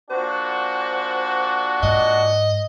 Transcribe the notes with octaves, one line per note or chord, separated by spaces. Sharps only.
A#2 D4 F#4 C5
G#2 D#5